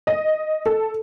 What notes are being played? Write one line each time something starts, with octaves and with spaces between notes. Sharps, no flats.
D#5
A4